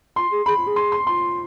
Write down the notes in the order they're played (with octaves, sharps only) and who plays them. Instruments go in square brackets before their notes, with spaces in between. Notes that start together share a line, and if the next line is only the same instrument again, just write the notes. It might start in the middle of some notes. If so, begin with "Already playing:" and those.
[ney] F4 [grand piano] C6
[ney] G#4
[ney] G#4 [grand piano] B5
[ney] F4
G#4
[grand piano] C6
C6
[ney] F4 [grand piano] C6